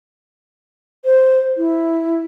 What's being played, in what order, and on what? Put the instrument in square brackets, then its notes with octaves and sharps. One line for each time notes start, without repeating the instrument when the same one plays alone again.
[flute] C5
E4